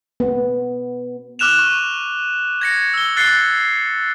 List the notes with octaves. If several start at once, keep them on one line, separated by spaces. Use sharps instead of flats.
B3
D6 F6 F#6 E7 F7
C#6
G#6 A#6 C#7
E6 G7
F#6 A6 C7 C#7 G7